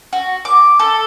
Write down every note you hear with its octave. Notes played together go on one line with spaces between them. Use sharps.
F#4
D6
A4